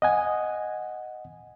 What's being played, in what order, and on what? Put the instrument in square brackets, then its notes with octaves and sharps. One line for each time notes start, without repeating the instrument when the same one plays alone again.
[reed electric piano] D#5 F#5 G#5